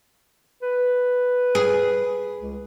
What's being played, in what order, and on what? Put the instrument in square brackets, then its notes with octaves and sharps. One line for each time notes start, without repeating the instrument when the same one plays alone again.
[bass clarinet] B4
[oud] G#4
[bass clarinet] C#2